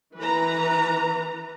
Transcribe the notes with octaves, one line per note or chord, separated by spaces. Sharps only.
E3 B4 A#5